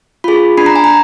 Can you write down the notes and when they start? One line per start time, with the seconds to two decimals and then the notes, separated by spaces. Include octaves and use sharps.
0.24 F4 G#4 B5
0.58 D4 B5
0.66 A#5
0.76 G#5
0.84 A#5